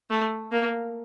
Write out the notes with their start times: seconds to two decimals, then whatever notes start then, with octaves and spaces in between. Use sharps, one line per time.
0.10 A3
0.52 A#3